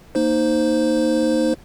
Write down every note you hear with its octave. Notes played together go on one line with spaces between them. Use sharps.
A#3 D#4 C5